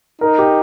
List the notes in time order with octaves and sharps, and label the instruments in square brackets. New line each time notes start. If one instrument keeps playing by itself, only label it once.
[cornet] D#4 [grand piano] A#4
[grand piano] G4